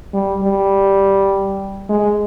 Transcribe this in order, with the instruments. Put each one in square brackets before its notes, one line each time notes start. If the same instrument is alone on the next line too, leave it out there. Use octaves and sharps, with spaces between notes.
[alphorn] G3
G3
G#3